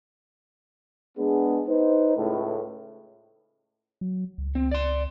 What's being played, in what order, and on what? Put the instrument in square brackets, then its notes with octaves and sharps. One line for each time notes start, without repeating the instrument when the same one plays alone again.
[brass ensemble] G#3 B3 D4 G#4
D#4 B4 C5
C#2 A2
[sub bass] F#3
C#2
[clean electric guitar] C4
D5 C6